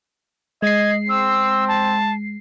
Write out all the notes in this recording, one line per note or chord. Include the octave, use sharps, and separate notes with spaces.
G#3 D#5 G#6 C7
C4 E6
A5